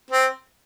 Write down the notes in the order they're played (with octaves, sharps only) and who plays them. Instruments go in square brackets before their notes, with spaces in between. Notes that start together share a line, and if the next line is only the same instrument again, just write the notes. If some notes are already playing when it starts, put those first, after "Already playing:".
[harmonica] C4